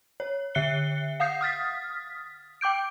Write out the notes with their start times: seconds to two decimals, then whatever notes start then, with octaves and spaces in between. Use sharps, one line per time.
0.20 C#5
0.55 D3 E5 F#6 C7 C#7 G7
1.20 F5 F#5 D#6 G6 C7
1.41 D#6 F6 A6 B6
2.61 G5 D6 G6 D7